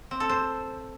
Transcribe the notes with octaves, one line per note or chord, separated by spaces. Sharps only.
C4
A4
C5